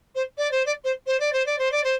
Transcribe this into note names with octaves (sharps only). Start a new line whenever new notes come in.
C5
D5
C5
D5
C5
C5
D5
C5
D5
C5
D5
C5